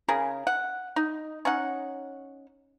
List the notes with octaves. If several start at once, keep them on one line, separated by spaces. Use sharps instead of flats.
C#3 G#4 A#4
F#5
D#4
C#4 D#4 F#5